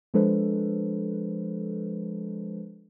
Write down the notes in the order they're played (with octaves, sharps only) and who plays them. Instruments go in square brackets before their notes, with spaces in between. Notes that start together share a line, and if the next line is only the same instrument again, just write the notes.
[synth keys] F3 G#3 D4 A4 B4 C5